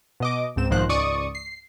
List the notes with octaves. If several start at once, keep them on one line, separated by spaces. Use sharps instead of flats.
B2 D#5 D6
C#2 G#2 C4 E7
B1 G#2 D#3 F3 C5 F#6
C#2 G#2 D5 C#6 D#6
C7